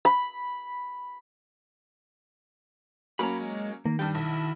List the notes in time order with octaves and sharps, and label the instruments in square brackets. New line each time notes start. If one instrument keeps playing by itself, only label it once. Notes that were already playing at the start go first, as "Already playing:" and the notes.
[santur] B5
[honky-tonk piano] F#3 A#3 C#4 [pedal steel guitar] A#5 B5
[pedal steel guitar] G#3
[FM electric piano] D#3 [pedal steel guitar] A#3
[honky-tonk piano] G2 G3 [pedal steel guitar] G5
[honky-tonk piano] B1 [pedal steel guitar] E4